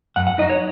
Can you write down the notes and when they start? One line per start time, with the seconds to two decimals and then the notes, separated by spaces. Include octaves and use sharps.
0.16 F#2 F#5
0.27 F#5
0.38 F#3 D#4 D#5
0.49 C#5